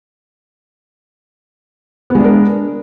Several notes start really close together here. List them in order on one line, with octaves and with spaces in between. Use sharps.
B3 G#3 D4 A#4